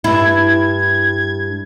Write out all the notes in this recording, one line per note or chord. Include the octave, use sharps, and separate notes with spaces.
G2 E4 G#6